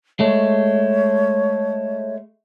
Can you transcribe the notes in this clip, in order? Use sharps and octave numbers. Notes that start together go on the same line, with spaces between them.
G#3 A3 C#5